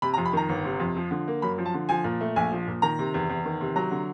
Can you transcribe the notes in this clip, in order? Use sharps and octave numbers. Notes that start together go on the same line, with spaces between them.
C3 B5
A#5
F2
B5
D#3 A#5
G1
C3
F2
F3
D3
A#3
F#2 B5
F3
A5
D3
F3 G#5
A#2
A3
A#1 G#5
F3
A#2
D#3 A#5
C3
E2
E2
D#3
C3
F#3 A#5
D3